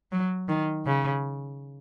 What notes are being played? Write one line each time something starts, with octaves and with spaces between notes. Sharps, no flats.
F#3
D#3
C#3